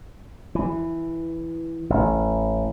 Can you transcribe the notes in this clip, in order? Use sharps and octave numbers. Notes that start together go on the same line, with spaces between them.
E3
A1